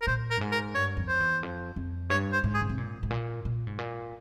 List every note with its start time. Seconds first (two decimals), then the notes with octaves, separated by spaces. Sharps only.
0.02 A#4
0.07 A#2 C5
0.31 A#4
0.37 G2
0.41 G#2
0.52 A#4
0.75 G2 C#5
0.97 F2
1.08 C5
1.20 E2
1.43 F2
1.76 F2
2.10 G2 C#5
2.32 C5
2.44 G#2
2.54 G#4
2.61 C#3
2.69 C3
2.78 A#2
3.03 G#2
3.11 A#2
3.45 A#2
3.67 G#2
3.79 A#2